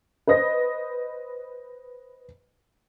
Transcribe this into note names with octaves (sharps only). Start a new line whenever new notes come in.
B4 C5 D#5 A#6